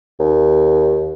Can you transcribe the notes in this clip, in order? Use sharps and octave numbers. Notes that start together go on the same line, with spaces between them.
D#2